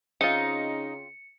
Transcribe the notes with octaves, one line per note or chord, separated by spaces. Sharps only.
C#3 C4 D#4 F4 C#7